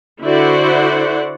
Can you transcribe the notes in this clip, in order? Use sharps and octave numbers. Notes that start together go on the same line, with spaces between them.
D3 E4 F#4 C5 D5 F#5